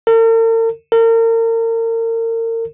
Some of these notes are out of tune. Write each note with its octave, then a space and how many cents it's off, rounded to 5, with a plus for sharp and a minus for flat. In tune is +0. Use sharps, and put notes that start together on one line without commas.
A#4 -45
A#4 -35